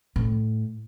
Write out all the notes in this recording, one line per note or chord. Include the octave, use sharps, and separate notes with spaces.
A2